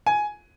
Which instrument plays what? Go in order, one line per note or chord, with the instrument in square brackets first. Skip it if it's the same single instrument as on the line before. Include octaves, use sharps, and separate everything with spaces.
[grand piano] G#5